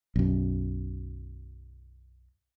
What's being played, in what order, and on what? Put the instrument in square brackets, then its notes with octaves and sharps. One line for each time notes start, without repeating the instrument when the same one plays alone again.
[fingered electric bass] B1 F#2